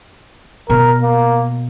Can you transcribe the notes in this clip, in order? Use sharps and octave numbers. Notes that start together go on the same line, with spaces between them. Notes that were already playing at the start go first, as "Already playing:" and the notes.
B2 A#4
A#3